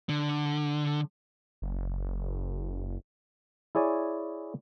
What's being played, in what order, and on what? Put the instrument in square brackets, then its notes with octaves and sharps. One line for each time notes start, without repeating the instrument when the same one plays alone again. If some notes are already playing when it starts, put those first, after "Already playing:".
[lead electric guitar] D3
[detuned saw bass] F#1
[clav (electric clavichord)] E4 G#4 C#5 D5 G#5